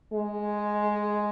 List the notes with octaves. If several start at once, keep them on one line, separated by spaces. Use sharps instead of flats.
G#3